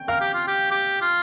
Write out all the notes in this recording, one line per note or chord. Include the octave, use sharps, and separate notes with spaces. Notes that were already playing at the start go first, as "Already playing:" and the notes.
Already playing: G5 G6
A#4 F5 F6
G4
F4
G4
G4
F4